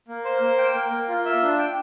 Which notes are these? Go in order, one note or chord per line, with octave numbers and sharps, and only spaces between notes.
A#3
C5
A#3
G5
A#3
A#3
F4
E5
D4
G5